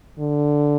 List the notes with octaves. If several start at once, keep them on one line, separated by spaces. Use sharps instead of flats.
D3